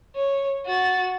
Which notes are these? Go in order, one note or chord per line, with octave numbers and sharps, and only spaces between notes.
C#5
F#4 A6